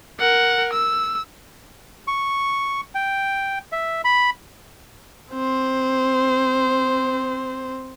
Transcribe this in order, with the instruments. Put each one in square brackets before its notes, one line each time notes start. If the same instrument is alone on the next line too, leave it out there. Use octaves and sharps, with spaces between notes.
[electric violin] A#4 F#5
E6
[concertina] C#6
G5
E5
B5
[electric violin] C4 C5